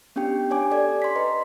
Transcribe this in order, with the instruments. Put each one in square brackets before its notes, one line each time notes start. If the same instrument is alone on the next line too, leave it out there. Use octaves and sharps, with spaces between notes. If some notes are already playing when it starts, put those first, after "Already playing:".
[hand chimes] B3 C#4 D4 G4 G5
D4 G4 C#5 G#5 D6
G4 A4 D5 G#6
C6 B6
B4 D#5 A#5